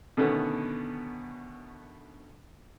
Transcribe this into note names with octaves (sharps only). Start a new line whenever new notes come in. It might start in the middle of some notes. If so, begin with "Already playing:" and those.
B2 D3 D#3 A3 B3 C#4